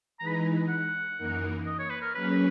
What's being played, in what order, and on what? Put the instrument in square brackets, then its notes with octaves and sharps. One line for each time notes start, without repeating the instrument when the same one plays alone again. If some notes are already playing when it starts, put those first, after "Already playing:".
[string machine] E3 G#3 D#4 G#4 B4 [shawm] A#5
[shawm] B5
A#5
F#5
[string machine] F#2 E3 A#3 D#4 A#4
[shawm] D#5
C#5
B4
A#4
[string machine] F#3 A#3 C#4 G#4 C#5 [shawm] B4